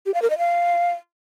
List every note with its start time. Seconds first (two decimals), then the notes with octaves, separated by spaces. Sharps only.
0.06 G4
0.14 F5
0.22 A#4
0.30 D#5
0.38 F5